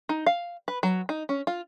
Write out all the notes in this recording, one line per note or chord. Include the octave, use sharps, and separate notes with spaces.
D#4
F5
B4
F#3
D#4
C#4
F4